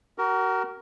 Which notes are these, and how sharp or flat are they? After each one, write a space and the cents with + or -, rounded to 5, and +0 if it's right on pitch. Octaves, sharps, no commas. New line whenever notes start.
F#4 +35 A#4 +0